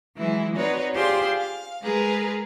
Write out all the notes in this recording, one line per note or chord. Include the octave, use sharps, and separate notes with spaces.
E3 F#3 G#3 E4
C4 D#4 F#4 B4 C#5 D5
F4 G4 G#4 C5 D5 C6
F5
G#3 G#4 A#4 B4